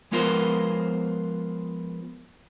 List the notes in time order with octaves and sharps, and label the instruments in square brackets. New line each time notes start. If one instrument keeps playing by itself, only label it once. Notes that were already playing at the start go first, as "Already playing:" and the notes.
[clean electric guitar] F3 G#3 B3 F4 A#4 C5